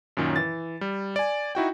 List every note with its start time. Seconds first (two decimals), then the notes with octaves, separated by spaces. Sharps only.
0.17 F#2 A#2 D#3 C#4
0.36 E3 A6
0.81 G3
1.16 D5 G#5
1.55 D#4 E4 F#4 G5